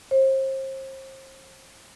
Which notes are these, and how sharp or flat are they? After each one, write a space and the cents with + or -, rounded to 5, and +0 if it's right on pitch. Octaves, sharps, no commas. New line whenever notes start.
C5 +35